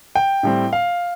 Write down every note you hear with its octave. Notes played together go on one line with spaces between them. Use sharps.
G5
A2 G3 C4
F5